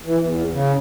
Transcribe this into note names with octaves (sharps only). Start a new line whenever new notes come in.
E3
E2
C#3